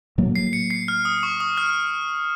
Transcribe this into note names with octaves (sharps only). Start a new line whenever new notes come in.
A2 F#3 A#3
C7
C#7
C7
F6
D#6
C#6
D#6
F6